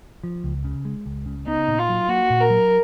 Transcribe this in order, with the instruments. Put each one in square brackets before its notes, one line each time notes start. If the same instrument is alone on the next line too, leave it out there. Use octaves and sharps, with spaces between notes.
[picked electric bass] F3
C#2
C#3
G#3
C#2
C#3
[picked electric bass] B3 [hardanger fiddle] D#4
[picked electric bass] A#2
[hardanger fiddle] F4
[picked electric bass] F#3
[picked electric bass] A#3 [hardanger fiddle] F#4
[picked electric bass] A#2
[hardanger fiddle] A#4
[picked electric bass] F#3